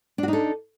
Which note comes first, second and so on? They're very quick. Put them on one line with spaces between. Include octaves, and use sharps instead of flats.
D4 F#4 D#4 A4